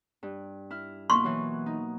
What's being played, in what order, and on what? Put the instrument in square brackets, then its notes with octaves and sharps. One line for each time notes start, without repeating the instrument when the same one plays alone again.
[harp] G2
E4 F6
[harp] B2 A#3 E4 [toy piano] C6 C#6
[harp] E3 F#3
D#4